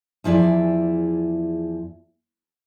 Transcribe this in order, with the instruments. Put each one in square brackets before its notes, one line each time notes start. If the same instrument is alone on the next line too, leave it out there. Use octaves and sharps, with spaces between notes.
[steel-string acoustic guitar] E2 F3 E4 G#4 D5